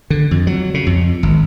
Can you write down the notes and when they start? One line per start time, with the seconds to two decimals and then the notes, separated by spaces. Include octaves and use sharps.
0.10 D3
0.31 F2
0.47 F#3
0.74 C#3
0.87 F2
1.23 G#1